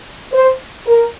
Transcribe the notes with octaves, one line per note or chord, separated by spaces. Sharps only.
C5
A#4